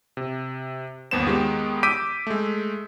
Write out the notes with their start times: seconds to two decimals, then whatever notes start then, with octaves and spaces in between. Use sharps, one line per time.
0.17 C3
1.11 G1 D#2 B3 C5 E7
1.27 D#3 G#3 B3 G4
1.83 D6 E6 G6 B6 D7 D#7
2.27 G#3 A3